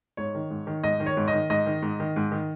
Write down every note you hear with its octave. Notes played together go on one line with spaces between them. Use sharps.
G#2 C#5
D#3
G#2
D#3
G#2 D#5
D#3
C#5
G#2
D#5
D#3
G#2 D#5
D#3
G#2
D#3
G#2
D#3